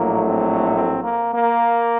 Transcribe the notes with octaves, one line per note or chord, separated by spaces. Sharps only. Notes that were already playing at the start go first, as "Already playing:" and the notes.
Already playing: A#1 A2 F#3 A3 A#3
C4
C4
A#3
A#3